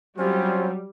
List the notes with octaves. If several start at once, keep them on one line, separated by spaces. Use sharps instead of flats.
F#3 G3 C4 C#4 F4 C5